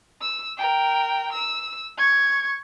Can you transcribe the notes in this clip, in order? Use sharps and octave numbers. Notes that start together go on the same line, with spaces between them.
E6
A#4 G5
E6
C#6 G#6